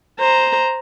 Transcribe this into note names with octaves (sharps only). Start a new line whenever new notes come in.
C5 A#5